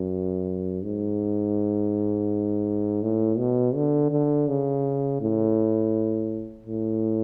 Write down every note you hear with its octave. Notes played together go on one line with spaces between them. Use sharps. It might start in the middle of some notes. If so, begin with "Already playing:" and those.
Already playing: F#2
G#2
A2
B2
D3
D3
C#3
A2
A2